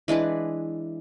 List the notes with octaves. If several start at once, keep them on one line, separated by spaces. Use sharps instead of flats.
E3 G#3 D4 B4